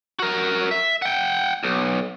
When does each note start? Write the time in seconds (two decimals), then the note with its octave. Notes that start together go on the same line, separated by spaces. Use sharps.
0.19 F#4 A#4
0.71 E5
1.02 F#5 G5
1.63 B1